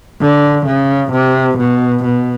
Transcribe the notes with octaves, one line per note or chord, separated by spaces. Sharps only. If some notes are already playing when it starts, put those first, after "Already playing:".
D3
C#3
C3
B2
B2